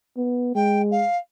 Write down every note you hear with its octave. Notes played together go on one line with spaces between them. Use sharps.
B3
G#3 G5
F5